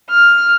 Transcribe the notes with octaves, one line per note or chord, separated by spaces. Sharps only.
F6